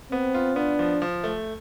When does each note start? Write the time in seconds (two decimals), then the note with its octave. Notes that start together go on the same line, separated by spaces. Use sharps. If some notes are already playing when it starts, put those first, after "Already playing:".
0.11 B3 C4
0.34 F4
0.56 B3 D4
0.79 F3
1.02 F3
1.24 A3